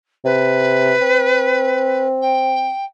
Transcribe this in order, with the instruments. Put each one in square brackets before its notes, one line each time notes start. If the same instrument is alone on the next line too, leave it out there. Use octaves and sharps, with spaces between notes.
[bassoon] C3 [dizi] B4
[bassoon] C4
[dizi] G5